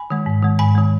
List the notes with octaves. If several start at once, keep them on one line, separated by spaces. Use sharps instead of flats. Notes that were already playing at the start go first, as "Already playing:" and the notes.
Already playing: G#5 B5
D#3 G#3
G#2
D#3 G#3
G#2 G#5 B5
D#3 G#3